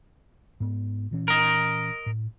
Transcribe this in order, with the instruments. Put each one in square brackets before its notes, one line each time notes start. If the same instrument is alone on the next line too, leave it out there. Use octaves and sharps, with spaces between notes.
[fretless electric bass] G#2 B3
A#2 E3 C#4
[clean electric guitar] A#4 D#5
[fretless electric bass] A2